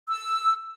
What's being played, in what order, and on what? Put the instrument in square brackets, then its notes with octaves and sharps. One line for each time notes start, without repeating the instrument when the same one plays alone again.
[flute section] E6